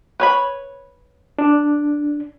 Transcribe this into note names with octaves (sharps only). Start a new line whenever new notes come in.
B4 C#5 B5
D4